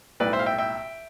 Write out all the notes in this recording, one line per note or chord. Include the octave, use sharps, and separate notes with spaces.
B1 A2 G3 B4 D5
C5 E5
F5
E5 G5
E5 G5